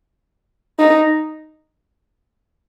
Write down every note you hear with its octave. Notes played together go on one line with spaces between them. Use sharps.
D#4